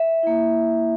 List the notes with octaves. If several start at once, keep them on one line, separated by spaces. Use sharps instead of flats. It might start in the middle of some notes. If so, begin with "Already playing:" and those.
Already playing: E5
A#3 E4